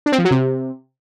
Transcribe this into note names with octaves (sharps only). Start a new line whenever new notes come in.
D4
C4
F3
F#3
C3